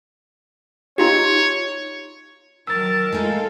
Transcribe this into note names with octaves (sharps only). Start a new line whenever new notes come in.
D#4 F4 G4 C#5
D#3 F#3 A#4 A5 E6 A6
G#3 A3 D#4 F4 A4